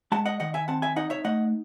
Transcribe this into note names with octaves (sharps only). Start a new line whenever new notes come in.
G#3 F#5 A5
D#5 F#5
D#3 D#5 F#5
E5 G#5
C4 F#5 A5
E5 G#5
D#4 D#5 F#5
C#5 E5
A3 D#5 F#5